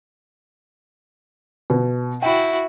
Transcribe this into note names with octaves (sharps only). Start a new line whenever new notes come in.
B2
E4 F#4 G5